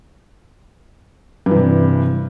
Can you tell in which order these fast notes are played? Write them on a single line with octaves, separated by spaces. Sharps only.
G2 E3 C3